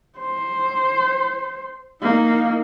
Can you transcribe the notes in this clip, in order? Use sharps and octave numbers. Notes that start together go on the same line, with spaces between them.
C5
A#3 D#4